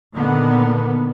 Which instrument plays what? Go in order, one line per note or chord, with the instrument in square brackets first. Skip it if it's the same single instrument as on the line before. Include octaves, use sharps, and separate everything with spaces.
[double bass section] A#2 D3 D#3 A#3 B3